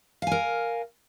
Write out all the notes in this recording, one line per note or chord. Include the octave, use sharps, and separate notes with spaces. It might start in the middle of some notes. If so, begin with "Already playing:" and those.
A#4 F5 G#5